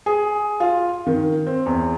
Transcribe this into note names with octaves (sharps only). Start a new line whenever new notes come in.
G#4
F4
D#3
C4
E2